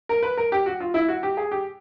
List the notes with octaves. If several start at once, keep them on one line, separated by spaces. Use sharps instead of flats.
A#4
B4
A#4
G4
F#4
F4
E4
F#4
G4
G#4
G4